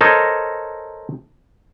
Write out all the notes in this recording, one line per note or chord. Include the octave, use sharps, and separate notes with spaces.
A4 A#4 C5 C#5 D#5